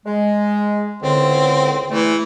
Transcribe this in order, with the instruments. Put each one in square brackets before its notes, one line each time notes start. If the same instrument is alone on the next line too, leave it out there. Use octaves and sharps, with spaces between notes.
[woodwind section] G#3
[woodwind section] C#2 A2 D3 [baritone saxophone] C4
[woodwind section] E2 A3 [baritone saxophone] E3